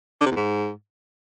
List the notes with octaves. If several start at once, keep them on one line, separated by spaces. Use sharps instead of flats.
D3
C3
E2
G#2